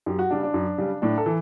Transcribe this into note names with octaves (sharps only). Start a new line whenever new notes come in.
F#2 G4
F#4
C#3 G3 D4
D4
F#2
C#3 G3
A2 D4
A4
E3